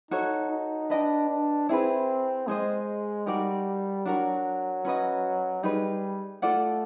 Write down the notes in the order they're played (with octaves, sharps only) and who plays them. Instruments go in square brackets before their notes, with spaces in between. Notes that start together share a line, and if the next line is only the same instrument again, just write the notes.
[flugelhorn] D#4 [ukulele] F#4 A4 C#5
[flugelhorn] D#4
[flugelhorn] D4 [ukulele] B4 D#5 G5
[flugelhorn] D4
[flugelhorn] C4 [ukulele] E4 G#4 B4
[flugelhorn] G#3 [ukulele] G#4 C5 D#5
[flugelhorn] G3 [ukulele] D#4 F#4 A#4 D5
[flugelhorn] F#3 [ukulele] D4 F#4 A#4
[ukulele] C#4 F#4 B4 D#5
[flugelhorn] G3 [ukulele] D#4 G#4 B4
[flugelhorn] A3 [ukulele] F4 A4 D5 F#5